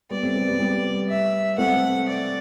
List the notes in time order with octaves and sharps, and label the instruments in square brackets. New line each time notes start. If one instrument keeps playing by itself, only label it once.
[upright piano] G3 B3 [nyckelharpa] D5
[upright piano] A3 C4
G3 B3
G3 B3
G3 B3
[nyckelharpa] E5
[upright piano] A3 C4 [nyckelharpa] F#5
[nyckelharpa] D5